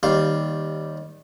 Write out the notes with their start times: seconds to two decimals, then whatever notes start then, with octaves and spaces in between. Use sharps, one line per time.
0.03 D#2 G3 F5